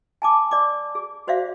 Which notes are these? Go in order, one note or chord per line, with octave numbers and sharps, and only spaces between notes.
G#5 A5 D6
D5 D6
G#4
F#4 C5 D5 E5 F5